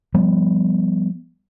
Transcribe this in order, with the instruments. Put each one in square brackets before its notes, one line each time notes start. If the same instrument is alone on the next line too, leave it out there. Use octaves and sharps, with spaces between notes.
[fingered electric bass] F3 G3 B3